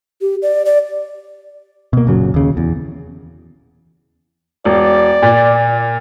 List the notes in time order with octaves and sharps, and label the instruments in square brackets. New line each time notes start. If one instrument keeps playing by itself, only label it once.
[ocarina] G4
D5
D5
[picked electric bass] B2 A#3
F#1 A#2 C#3 F#3
D#2 C#3
E2
[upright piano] E1 [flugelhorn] D5
[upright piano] A#2